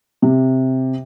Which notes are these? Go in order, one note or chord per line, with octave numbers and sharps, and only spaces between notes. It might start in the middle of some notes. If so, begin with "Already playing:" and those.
C3